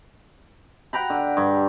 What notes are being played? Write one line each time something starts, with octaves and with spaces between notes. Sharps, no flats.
F#5 G5 A#5 B5
D3
G2